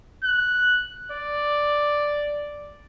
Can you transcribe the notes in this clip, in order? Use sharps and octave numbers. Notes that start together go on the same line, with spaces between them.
F#6
D5